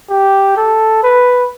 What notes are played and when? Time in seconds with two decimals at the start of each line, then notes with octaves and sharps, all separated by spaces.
0.10 G4
0.57 A4
1.03 B4